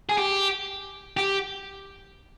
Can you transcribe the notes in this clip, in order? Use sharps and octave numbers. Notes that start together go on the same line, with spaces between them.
G#4
G4
G4